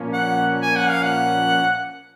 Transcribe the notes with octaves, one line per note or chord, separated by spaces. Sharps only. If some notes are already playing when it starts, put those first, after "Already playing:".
Already playing: A#2 F3 A#3 C#4
F#5
G#5
F#5
F5
F#5